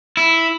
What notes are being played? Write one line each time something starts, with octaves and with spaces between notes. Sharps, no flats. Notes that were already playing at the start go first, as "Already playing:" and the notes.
E4